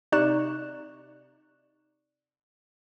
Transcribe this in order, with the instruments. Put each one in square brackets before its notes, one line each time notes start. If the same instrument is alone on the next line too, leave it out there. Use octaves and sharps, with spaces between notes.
[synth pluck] C3 D#4 D5 C#6 F#6 E7